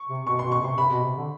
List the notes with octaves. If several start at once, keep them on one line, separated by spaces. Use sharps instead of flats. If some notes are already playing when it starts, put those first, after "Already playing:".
Already playing: C#6
C3
B2 C#6
C6
B2
C#6
C3 C6
C3 B5
B2
C3
D3